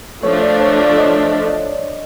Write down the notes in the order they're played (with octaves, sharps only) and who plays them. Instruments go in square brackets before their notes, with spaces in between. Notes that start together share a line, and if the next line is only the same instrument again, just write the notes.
[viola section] F3 A3 D4 [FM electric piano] C#5
[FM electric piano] D5
C#5
D5
D#5